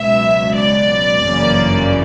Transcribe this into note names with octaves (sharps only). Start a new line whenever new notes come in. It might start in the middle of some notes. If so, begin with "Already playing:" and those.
Already playing: C#2 B2 F#3 E5
D5
G1 F#2 C#3 E3 A#3